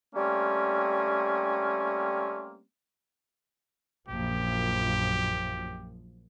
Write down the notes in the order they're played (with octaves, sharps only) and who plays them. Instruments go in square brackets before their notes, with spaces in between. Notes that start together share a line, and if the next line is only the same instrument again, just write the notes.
[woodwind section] G3 A3 A#3 C4 C#4
[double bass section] A#1 F#2 F3 [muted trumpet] G4